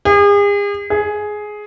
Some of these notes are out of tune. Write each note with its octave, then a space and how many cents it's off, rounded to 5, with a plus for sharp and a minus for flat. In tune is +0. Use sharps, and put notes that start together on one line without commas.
G#4 -40
G#4 +10